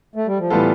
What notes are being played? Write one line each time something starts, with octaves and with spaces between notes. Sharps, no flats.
A3
G3
F3
A2 E3 G3 B3 F4 A4